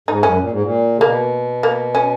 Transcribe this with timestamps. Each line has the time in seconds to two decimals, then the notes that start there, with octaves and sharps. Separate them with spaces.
0.08 G#2 D#4
0.23 F#2 C#4
0.39 A#2
0.51 G#2
0.62 A#2
0.97 C#3
1.01 B2 A#3
1.63 A#3
1.95 C#4